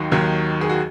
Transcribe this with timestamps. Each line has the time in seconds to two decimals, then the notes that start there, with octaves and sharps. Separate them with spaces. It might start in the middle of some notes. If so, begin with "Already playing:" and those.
Already playing: D#2 D#3 F#3 D#4 F#4
0.12 D#2 D#3 F#3
0.61 G#4
0.69 F#4